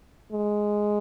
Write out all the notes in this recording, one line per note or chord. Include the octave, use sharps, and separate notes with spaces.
G#3